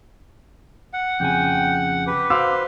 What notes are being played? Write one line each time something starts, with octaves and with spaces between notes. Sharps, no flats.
F#5
F2 C#3 G5 G#5
G4 B4
F#4 C5 F5 D6 E6